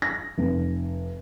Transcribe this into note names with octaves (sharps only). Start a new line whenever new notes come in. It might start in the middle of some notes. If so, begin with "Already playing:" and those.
A#6
F1